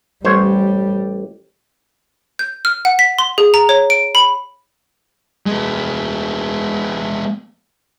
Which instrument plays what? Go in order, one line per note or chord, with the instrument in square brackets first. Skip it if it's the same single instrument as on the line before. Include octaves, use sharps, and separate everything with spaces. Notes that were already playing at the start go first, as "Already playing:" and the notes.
[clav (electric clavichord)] A1 C5 C#5 [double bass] G3
[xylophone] G6
F6
F#5
B6
C6
G#4
A#5
C#5
D7
B5
[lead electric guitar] G#3 B3